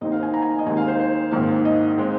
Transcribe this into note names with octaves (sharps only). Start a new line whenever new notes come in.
D#2 D#3 C4 D#4 D#5
F5
G#5
A#5
G#5
D#5
D#2 D#3 G#3 C4 G#5
F5
C5
C5
A#1 G#2 D#3 C4 F5
D#5
G#3 C4 D#4